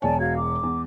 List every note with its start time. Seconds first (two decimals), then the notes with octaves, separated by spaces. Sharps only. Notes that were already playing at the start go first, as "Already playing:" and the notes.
0.02 E1 E2 C#5 D5 G#5 A5
0.19 F#4 F5 G#6
0.37 D6
0.63 E2